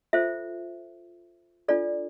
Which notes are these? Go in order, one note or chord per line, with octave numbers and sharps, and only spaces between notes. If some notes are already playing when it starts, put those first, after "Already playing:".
F4 A4 C5 E5
D4 F4 A4 D5